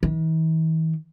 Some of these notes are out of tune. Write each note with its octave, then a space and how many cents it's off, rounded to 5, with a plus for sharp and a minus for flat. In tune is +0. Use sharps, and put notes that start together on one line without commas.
E3 -45